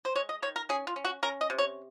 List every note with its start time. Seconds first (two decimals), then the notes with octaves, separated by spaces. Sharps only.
0.05 C5
0.15 G#3 C#5
0.29 D#5
0.42 D#3 C#5
0.56 A#4
0.69 C#4 G#4
0.87 F4
0.96 C#4
1.05 F#4
1.23 C#4 A#4
1.41 D#5
1.50 C3
1.58 C#5